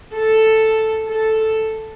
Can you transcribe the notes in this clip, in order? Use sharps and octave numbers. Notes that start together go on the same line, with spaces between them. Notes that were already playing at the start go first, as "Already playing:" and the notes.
A4
A4